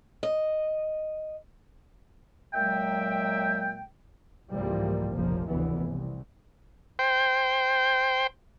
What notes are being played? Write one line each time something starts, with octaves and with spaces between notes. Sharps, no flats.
D#5
A#2 F#3 G#3 E5 G5
C2 G#2 E3 F3 G3 A#3
F1 A#1 C#3 F3 A#3
F1 D2 C#3 E3 B3
C2
C5 G5